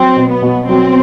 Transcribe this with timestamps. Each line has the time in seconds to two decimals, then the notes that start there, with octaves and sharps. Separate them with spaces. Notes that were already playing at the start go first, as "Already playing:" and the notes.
Already playing: F#3 C4
0.16 B2
0.30 B3
0.42 B2
0.68 F#3 C4